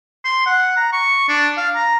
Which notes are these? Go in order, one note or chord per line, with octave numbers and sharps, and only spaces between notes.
C6
F#5
A#5
C#6
D4
F5
A#5